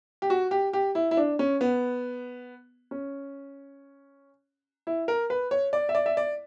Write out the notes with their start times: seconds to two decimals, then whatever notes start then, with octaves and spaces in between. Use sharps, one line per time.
0.22 G4
0.30 F#4
0.51 G4
0.73 G4
0.95 E4
1.11 E4
1.17 D4
1.39 C#4
1.61 B3
2.91 C#4
4.87 E4
5.08 A#4
5.30 B4
5.51 C#5
5.73 D5
5.89 E5
5.95 D5
6.06 E5
6.17 D5